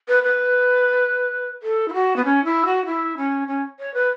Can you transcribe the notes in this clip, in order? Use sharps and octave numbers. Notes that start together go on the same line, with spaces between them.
B4
B4
A4
E4
F#4
B3
C#4
E4
F#4
E4
C#4
C#4
C#5
B4